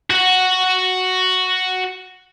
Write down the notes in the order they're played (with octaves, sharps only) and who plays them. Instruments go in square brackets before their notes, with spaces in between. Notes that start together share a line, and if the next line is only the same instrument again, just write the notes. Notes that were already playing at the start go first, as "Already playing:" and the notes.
[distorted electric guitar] F#4 F#5